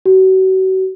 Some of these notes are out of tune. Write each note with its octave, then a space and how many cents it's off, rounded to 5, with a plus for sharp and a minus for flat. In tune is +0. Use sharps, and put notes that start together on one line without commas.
F#4 +35